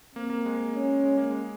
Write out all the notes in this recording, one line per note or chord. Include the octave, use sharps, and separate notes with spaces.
A#3 C4
A#3
G#3
C#4
G#3
A#3
G#3